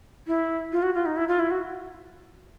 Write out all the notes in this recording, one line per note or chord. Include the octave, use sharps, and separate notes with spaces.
E4
F4
F#4
F4
D#4
E4
F4
E4
F#4